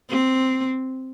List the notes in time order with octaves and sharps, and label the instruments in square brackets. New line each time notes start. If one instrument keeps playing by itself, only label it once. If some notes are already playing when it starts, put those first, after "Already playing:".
[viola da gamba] C4